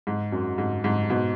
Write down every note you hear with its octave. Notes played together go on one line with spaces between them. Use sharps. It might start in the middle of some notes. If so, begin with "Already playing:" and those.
G#2
F#2
G#2
G#2
G#2 B2